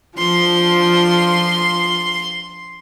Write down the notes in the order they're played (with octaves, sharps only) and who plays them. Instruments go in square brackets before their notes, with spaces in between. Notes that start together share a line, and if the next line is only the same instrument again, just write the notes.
[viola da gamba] F3 D4 F4 [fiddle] C6